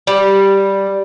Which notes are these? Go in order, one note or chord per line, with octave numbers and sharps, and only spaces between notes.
G3